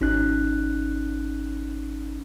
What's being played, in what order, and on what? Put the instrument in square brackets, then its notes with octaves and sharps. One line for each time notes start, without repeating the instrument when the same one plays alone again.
[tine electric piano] G#1 C#4 D#4 F#6